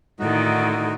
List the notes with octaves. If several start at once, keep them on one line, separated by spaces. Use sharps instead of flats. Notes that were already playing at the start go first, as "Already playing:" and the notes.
A2 D3 D#3 D#4 F#4